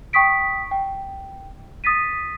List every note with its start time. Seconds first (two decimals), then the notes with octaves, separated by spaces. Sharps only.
0.13 G5 C#6 D#6 B6 D7
0.71 G5
1.84 D#6 A6 B6 D#7